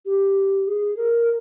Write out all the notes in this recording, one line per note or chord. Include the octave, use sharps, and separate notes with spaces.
G4
G#4
A#4